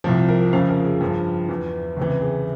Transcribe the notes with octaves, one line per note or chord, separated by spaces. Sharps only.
C2 C3 F3
A#4
F2 C#3 F3 F5
A#4
G#4
G2 F3
E2 E3
C#2 C3 E3
G#4